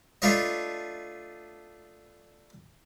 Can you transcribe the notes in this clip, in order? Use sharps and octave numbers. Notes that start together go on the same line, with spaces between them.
A3 D4 F4 B4 C#5 D#5